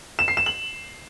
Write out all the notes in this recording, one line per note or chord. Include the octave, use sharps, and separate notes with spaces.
E7
C7
E7
F#7